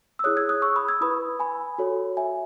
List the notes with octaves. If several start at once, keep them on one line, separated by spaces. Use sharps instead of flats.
E6
E4 G#4 C#5 D#6 F#6
E6 G#6
D#6 F#6
C#6 E6
B5 D#6
E6 G#6
E4 B4 B5 D#6
G#5 B5
F#4 A4 C#5
E5 G#5